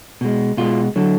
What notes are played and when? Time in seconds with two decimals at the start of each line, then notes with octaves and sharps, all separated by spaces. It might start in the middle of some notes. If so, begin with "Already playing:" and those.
0.21 B2 G#3
0.57 B2 G#3 F4
0.96 D3 F#3